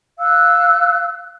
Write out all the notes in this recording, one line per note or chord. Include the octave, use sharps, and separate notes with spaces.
F5 E6 F#6